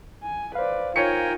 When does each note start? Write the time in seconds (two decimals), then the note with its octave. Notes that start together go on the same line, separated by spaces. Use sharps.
0.23 G#5
0.55 B4 C5 D5 F5
0.96 D#4 F4 A#4 C#5 G5 G#5 C#7